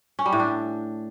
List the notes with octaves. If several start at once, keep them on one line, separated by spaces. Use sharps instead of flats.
C#4
G3
A2
D4